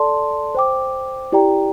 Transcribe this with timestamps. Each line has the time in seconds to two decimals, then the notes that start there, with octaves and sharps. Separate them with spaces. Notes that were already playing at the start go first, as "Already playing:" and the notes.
Already playing: A4 D5 A5 C6
0.55 C5 G5 D6
1.32 E4 G4 D5 G5 A#5